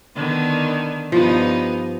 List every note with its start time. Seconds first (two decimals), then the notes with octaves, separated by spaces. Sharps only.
0.15 D3 D#3 B3
1.12 G2 F3 B3 D#4